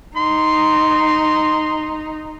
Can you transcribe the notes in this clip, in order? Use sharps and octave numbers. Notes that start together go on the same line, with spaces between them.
D#4 C6